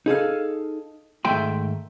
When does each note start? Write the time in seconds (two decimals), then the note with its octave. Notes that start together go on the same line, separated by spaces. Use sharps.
0.06 D#4 G#4 A4 F5
1.25 G#2 D#3 A3 E5 G5 C6